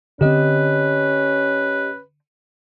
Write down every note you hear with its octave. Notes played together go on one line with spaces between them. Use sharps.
D3 C4 C#4 G4 B4 D#5